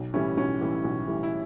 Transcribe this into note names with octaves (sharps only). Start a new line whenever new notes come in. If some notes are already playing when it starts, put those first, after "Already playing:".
Already playing: B1
A2 E3 G3 C#4 E4
B1 C#4
A2 E3 G3
B1
A2 E3 G3
E4